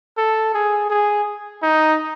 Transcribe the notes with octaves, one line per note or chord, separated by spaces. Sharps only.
A4
G#4
G#4
D#4